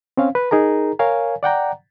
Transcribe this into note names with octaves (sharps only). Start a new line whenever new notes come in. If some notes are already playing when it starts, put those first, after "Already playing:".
C4 C#4 F5
B4
D#4 G#4 A#4 A#5
A#4 C#5 F5 G#5
D5 F#5 G5 A#5